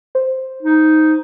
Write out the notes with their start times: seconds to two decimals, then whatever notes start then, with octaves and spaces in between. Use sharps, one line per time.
0.15 C5
0.62 D#4